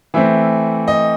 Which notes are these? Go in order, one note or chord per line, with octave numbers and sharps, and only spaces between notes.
E3 A3 C4 E5
D#5